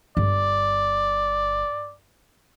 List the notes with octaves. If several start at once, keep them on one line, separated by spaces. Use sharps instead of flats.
G1 D5